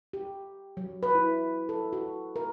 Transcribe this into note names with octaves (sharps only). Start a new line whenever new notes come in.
G4
F#3
B4
E4
A4
F#4
A#4